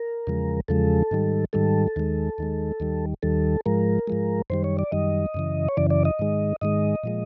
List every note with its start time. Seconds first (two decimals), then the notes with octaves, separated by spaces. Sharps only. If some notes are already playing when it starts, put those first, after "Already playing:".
Already playing: A#4
0.27 E2 C#3 F3 G#3
0.68 E2 C#3 F3 G#3 A4
1.11 G#2 D#3 G3
1.53 G#2 D#3 G3 A4
1.96 D#2 D#3 G#3
2.38 D#2 D#3 G#3
2.80 D#2 D#3 G3
3.23 D#2 D#3 G3 A4
3.66 G#2 F3 G#3 A#4
4.07 G#2 F3 G#3
4.50 F#2 D#3 G3 C5
4.64 C#5
4.79 D5
4.92 F#2 D#3 G3 D#5
5.34 F#2 C#3 E3
5.69 C#5
5.77 F#2 C#3 E3 D5
5.90 D5
6.05 D#5
6.19 G#2 D#3 G#3
6.61 G#2 D#3 G#3 D#5
7.04 A#2 F3 G#3